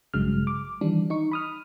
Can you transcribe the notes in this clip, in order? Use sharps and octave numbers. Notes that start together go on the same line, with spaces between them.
A1 G2 C#3 F#3 G#3 F6
D6
D#3 E3 G3 D4
D#4 C#6
B5 D#6 F6